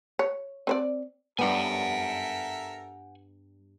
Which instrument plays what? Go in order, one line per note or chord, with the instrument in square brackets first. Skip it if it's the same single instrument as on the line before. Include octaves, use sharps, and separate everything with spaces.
[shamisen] C#5
C4 C5 D5
[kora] G2 G3 B3 [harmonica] A4 A#4 E5 [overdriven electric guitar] F#5 G#5